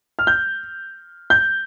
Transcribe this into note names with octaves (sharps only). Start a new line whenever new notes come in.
F6
G6
G6